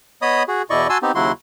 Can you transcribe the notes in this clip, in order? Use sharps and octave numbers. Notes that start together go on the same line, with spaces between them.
B3 C#5 D#5 B5 D#6
F#4 G#4
E2 B2 E4 D5 D#5 C#6
F#4 G#5 A5 C6 E6
B3 C4 D#4 G4
D#2 C#3 F#3 E4 F#4 C6